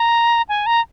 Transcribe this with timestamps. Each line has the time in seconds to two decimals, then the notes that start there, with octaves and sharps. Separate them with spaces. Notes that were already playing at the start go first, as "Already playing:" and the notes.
Already playing: A#5
0.49 G#5
0.66 A#5